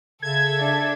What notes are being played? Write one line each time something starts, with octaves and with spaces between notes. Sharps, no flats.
C#3 A4 E5 G#6
D4